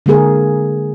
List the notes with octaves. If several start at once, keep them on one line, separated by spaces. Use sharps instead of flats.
D3 G#3 A#3 G#4 A#4